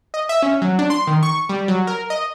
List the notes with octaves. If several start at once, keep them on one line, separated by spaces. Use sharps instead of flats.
D#5
E5
C#4
F#3
D4
C6
D#3
C#6
G3
F#3
A#4
D#5